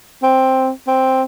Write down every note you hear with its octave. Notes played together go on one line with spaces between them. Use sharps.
C4
C4